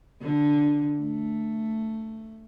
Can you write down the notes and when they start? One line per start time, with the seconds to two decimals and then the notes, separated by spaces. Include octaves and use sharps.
0.21 D3
0.99 A3